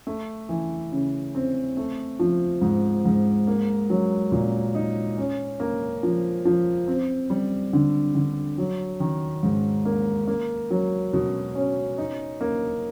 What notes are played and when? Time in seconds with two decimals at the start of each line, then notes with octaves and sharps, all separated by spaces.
0.07 A3
0.49 E3
0.92 C#3
1.35 C4
1.77 A3
2.19 F3
2.62 G#2
3.05 G#2
3.47 A#3
3.90 F#3
4.32 A#2
4.75 D#4
5.17 C#4
5.60 A#3
6.03 F3
6.45 F3
6.88 C4
7.30 G3
7.73 D3
8.15 D3
8.58 F#3
9.00 D#3
9.43 G#2
9.85 A#3
10.28 A#3
10.70 F#3
11.13 B2
11.55 C#4
11.98 D#4
12.41 A#3